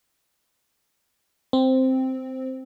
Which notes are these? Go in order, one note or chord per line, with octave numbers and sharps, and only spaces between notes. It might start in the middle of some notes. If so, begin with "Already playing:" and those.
C4